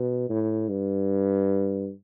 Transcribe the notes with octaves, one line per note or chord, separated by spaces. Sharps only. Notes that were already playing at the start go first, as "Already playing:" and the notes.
Already playing: B2
A2
G2